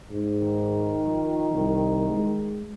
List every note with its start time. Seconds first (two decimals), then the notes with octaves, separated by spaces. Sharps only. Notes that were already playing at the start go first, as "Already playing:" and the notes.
0.11 G#2
0.41 D#3
1.07 F3
1.53 C2
2.10 G#3